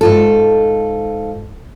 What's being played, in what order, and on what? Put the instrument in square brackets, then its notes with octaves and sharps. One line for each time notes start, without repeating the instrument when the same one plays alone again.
[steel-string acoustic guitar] G#2 F4 A4